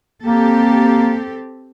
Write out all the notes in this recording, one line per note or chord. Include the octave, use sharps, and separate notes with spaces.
A#3 C4 G4 A4